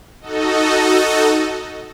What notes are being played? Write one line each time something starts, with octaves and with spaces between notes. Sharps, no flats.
D#4 F#4 A4 D#5